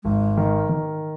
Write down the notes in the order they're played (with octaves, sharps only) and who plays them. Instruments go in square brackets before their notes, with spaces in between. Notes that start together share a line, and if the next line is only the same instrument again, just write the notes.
[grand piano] G#1 [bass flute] G#3
[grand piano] D#3
D#3